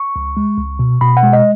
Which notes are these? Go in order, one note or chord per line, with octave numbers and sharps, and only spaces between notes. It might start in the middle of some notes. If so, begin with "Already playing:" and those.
Already playing: C#6
C#2
G#3
C#2
B2
B2 B5
F#5
G#3
D#5